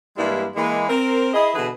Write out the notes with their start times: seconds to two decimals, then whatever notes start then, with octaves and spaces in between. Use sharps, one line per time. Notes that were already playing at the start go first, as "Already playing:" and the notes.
0.17 G2 E3 G3 G#3 A#3 E4
0.56 E3 G#3 A#3
0.89 C4 A#4
1.34 E4 G#4 D#5
1.54 B2 D3 E3 G#4 B4